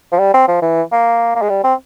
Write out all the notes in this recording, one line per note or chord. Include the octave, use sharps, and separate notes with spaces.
F3
G3
C4
F3
E3
A#3
A#3
G#3
G3
C4